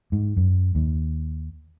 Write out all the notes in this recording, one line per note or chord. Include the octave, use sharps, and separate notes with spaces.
G#2
F#2
D#2